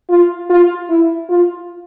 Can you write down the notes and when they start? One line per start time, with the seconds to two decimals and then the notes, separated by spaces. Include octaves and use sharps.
0.09 F4
0.49 F4
0.89 E4
1.29 F4